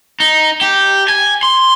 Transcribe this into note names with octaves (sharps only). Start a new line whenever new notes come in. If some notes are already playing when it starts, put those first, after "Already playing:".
D#4
G4
G#5
C6